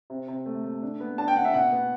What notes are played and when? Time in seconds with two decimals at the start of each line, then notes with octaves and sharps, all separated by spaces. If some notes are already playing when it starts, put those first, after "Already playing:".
0.10 C3
0.28 C3
0.46 A3
0.64 A3
0.82 D4
1.00 B3
1.18 D4 A5
1.28 G5
1.36 D4 F#5
1.45 E5
1.54 B2 F#5
1.72 B3